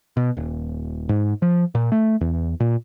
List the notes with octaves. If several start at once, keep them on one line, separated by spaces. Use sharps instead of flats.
B2
D#1
G#2
F3
A#2
A3
E2
A#2